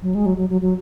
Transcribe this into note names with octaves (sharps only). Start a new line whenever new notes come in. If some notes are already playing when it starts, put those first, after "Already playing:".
F#3
G#3
F#3
F#3
F#3
F#3